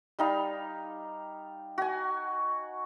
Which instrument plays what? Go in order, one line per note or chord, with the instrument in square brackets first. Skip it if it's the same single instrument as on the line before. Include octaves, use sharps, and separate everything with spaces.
[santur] G3 D#4 F5
F#4 G#5